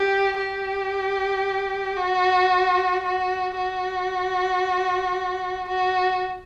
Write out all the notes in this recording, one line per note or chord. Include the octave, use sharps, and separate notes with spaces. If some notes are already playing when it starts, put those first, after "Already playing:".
Already playing: G4
G4
F#4
F#4
F#4
F#4